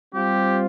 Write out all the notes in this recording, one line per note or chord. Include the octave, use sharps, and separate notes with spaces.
G3 C4 F4 G4